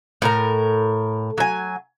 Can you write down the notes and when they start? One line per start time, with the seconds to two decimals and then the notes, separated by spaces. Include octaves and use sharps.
0.22 A2 A#4 A#5
1.38 F#3 G#5